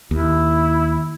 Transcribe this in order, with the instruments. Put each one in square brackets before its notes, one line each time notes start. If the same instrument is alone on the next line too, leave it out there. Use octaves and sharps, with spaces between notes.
[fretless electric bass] D#2 [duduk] E4